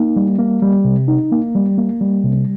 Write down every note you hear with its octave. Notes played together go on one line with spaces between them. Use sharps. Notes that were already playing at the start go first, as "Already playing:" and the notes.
Already playing: A#3 D#4
G3
A#3
G3
C3
D#4
A#3
G3
A#3
G3
C3